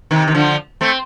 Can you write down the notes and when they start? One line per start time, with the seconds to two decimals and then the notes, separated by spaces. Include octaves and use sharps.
0.11 C3 D#3
0.27 D#3
0.34 D3 F3
0.81 A3 C4